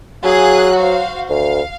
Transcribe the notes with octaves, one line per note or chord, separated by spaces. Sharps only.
F#3 G#4 F5 F#6
F#4 C5 F5
D2 F5